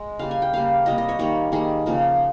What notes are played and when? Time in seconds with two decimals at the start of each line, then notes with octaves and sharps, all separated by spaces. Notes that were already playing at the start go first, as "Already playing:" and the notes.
Already playing: G#3 D#5
0.19 C#3 G3 A#3 F5
0.31 G#5
0.42 G5
0.53 C#3 G3 A#3 F5
0.86 C3 G3 A#3 D#5
0.98 D#5
1.09 C#5
1.19 D#3 G3 A#3 C#5
1.52 D#3 G3 A#3 G#4
1.86 C#3 F3 A#3